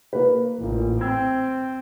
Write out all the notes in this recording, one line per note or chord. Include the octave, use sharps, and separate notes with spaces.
A#3 B4
A1 A#2 A#3
C4 G5 E6 G#6